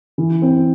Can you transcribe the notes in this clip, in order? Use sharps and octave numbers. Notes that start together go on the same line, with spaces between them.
E3
C4